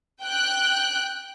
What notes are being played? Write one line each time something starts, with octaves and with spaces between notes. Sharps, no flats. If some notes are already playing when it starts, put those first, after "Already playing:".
G5 F#6